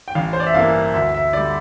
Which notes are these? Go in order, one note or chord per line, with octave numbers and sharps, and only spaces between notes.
G5
A1 F5
C5
D5
E5
G2 E3 A#3 F5
D2 E5
E5
D3 G3 D5